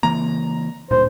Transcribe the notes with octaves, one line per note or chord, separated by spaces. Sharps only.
C#3 E3 A#3 A#5
D1 G2 A#2 C5